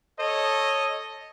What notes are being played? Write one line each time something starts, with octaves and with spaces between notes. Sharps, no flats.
A4 C#5 D#5